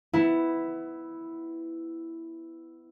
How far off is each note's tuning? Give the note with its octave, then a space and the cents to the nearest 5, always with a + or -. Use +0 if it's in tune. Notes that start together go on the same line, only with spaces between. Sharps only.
B3 +20 E4 +0